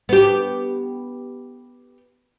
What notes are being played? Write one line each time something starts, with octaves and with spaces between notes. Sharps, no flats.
B3 G4